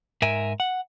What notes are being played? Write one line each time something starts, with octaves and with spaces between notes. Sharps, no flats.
G#2 A#4 E5 G#5
F#5